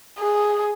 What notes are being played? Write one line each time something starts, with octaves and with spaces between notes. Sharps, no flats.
G#4